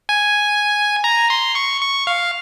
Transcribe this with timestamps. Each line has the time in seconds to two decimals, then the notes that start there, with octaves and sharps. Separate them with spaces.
0.09 G#5
1.04 A#5
1.30 C6
1.55 C#6
1.81 C#6
2.07 F5